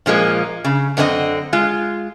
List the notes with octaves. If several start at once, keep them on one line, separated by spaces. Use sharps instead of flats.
A#2 F3 G#3 A#3
C#3
F#2 D3 C4 D4 D#5
G#3 F4